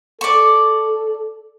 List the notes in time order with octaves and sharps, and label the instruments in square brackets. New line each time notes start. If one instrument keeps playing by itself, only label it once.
[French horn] A4 [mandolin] D5 C#6